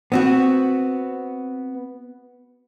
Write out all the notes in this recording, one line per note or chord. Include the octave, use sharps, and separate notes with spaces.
B3 C4 F#4